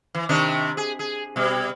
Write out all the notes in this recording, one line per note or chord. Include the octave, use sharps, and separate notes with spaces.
E3
C3 D#3 D4
G#4
G#4
B2 G3